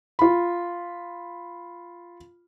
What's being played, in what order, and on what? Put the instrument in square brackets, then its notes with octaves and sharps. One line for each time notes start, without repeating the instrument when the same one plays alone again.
[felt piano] F4 B5